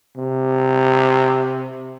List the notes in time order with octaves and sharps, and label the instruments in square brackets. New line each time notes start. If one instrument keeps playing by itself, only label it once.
[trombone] C3